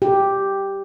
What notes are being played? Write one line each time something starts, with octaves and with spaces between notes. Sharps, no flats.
G4